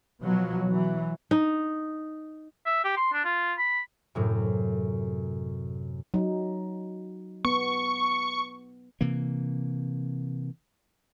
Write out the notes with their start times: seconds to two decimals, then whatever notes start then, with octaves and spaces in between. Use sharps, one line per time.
0.21 B2 F3 F#3
0.69 E3 F#3
1.31 D#4
2.66 E5
2.85 G4
2.97 C6
3.13 D4
3.25 F4
3.58 B5
4.15 F#2 A2 C3
6.14 F#3 D#4
7.45 B3 C#6
9.01 C3 E3 A#3